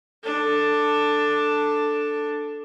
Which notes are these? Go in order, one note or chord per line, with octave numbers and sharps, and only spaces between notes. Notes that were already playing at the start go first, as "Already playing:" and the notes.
D4 A4